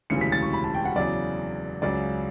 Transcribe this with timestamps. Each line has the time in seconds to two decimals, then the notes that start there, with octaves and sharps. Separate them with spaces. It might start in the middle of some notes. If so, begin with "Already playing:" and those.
0.10 E1 D2 C#3 E3 G3 C#7
0.21 B6
0.32 A6
0.42 C#6
0.53 B5
0.64 A5
0.74 G5
0.85 F#5
0.96 E2 C#3 F#3 D5
1.82 C#2 C#3 F#3 D5